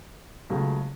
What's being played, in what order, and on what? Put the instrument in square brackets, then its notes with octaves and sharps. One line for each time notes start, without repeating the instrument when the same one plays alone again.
[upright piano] C#2 C#3 F#3 A3